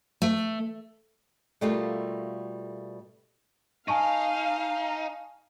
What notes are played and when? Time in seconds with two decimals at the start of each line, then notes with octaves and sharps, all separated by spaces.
0.22 A3
1.61 B2 G3 A3 A#3 F4 A4
3.88 D#4 F5 G#5 A5 C#6